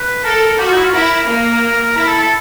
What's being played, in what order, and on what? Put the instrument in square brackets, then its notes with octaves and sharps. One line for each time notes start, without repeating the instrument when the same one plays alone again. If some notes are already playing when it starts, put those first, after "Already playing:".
Already playing: [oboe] B4
[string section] A4 [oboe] A#4
[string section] F#4 [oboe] G4
[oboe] F4
D#4
E4
F4
[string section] E4 [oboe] A#4
[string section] A#3
[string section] E4 [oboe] A#4
[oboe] A4
A4